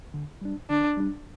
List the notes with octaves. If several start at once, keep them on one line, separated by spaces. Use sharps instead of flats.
D3
G3 D4
D3 D4
G3 D4